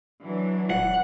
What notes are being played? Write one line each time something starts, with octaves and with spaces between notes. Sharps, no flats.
E3 F#3 D4
D#1 F#5